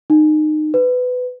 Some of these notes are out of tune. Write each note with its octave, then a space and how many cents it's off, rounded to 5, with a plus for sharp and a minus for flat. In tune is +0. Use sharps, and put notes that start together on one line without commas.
D#4 -25
B4 +20